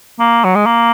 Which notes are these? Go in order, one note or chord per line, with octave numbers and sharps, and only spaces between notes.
A#3
F#3
G#3
A#3